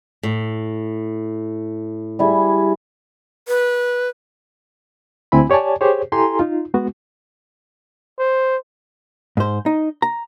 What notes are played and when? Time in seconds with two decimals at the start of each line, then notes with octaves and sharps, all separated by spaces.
0.23 A2
2.19 G3 E4 G#4
3.48 B4
5.32 D2 C4 E4 G#5 B5
5.50 G4 C#5 D5 G#5 A5
5.81 G4 G#4 C5 C#5
6.12 E4 G4 A4 G#5 A#5 C6
6.39 D#4 F4
6.74 G#3 B3 F#4
8.19 C5
9.37 G#2 C5
9.66 D#4
10.02 A#5